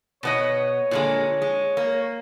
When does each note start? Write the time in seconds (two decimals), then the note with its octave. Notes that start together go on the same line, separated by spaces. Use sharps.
0.23 B2 B3 C#5 D#5
0.91 A#2 D3 G#3
1.42 G#3
1.77 A#3